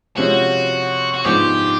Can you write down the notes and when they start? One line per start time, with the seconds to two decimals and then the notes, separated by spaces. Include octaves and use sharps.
0.17 C3 F3 G#3 C#4 F#4
1.14 F#4
1.25 G#2 F3 G#3 B3 D4 G4